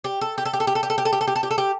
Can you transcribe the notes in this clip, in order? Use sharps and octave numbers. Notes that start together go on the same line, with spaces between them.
G4
A4
G4
A4
G4
A4
G4
A4
G4
A4
G4
A4
G4
A4
G4
A4
G4
A4
G4